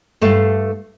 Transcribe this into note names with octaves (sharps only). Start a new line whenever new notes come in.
G2 A3 A4 F5